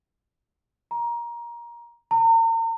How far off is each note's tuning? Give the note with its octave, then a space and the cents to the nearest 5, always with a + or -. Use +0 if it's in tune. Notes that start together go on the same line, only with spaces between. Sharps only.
A#5 +20
A#5 -40